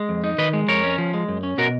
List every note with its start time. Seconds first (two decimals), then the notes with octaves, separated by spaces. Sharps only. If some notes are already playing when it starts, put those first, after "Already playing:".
Already playing: G#3
0.09 F2
0.24 D#4
0.38 D#3 B4 D#5
0.53 G#3
0.68 F2 A#4 C#5
0.83 C#4
0.98 F3
1.14 G#3
1.28 F#2
1.43 C#4
1.58 B2 F#4 A#4